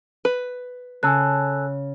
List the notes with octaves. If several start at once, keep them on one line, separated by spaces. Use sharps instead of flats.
B4
C#3 A4 G#5 E6 F#6